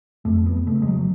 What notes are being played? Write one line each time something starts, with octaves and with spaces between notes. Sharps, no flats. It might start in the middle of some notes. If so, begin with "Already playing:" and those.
F2 A3
B3
C#3 A3
G#3
F#3